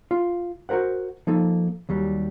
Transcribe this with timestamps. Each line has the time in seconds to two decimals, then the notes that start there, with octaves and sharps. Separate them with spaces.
0.11 F4
0.69 F#4 G4 A#4 C5 F#5
1.27 F3 A#3 D#4 A4
1.89 D#2 F#3 G3